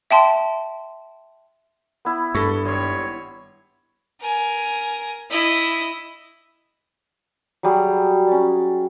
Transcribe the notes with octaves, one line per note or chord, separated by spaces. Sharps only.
E5 G5 A5 C6
B3 E4
G2 A4 C#6
G#1 G3 C#5 C6
A#4 G#5
E4 D#5
F#3 G3 G#4
C#4 D5